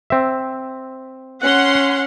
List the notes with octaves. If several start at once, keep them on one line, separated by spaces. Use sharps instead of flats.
C4 E5
C#4 F#5 C6